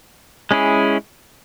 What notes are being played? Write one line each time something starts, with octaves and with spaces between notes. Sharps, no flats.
G#3 C#4 E4 G#4